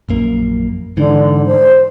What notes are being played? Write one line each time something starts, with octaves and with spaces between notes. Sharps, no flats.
A#1 F#2 A#3
G#2 D3 E3
C5